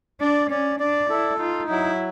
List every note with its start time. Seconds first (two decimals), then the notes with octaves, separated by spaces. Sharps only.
0.21 D4 D5
0.50 C#4 D5
0.80 D4 D5
1.10 E4 A4
1.39 D#4 F4
1.69 F#3 E4